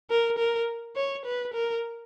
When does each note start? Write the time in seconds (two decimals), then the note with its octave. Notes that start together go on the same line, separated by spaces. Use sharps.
0.10 A#4
0.38 A#4
0.96 C#5
1.25 B4
1.54 A#4